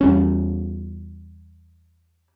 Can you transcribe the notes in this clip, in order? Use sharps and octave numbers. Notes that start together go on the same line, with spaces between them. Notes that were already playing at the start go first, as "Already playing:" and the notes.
E2 G3 C#4